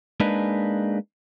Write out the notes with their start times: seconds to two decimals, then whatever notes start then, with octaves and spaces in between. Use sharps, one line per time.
0.20 G#3 A#3 D4 D#4 G#4 B4